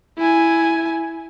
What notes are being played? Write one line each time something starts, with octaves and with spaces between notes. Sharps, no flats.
E4 G#5